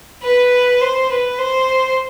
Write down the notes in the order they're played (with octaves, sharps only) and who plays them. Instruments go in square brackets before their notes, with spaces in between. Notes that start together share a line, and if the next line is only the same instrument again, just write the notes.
[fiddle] B4
C5
B4
C5